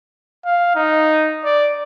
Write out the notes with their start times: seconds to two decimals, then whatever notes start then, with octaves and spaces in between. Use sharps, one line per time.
0.45 F5
0.75 D#4
1.44 D5